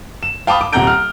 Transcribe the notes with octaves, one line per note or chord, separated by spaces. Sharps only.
E7
F5 G5 A5 B5 D6 D#6
D6
D#1 C3 F#5 A#5 G6 D7
F6